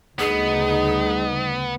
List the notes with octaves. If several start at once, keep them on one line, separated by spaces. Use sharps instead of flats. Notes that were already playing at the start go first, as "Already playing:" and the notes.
D2 C#3 G3 B3 D#4 G#4